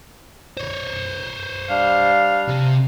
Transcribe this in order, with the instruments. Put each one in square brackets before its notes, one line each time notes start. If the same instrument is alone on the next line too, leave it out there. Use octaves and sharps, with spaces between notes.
[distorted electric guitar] C5 C#5
[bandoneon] G3 D4 [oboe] F5
[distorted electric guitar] C3